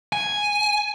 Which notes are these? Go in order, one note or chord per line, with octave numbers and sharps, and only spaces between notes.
G#5